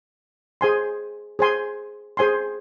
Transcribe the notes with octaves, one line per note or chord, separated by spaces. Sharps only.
G#4 C5 G#5 C6
G#4 C5 G#5 C6
G#4 C5 G#5 C6